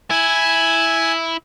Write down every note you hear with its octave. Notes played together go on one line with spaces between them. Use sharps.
E4 G#5